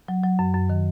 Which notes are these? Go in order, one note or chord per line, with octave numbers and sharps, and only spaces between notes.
F#3
F#3
F#2
F#2
D#3